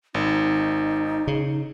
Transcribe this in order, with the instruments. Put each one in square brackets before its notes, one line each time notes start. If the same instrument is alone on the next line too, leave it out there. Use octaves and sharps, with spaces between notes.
[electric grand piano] G#1 [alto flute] D#4
[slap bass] C#3